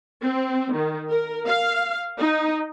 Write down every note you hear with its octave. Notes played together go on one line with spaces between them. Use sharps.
C4
D#3
A#4
F5
D#4